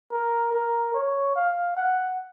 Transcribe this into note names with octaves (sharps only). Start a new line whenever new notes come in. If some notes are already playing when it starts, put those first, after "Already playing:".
A#4
A#4
C#5
F5
F#5